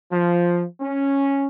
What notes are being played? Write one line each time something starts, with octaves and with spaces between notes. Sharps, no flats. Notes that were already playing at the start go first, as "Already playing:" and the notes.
F3
C#4